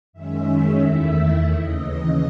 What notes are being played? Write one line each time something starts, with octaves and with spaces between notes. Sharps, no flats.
F#2 D#3 G#3 C#4 E5
E2 D#3 A3 E4
D#2 C#3 E3 D#5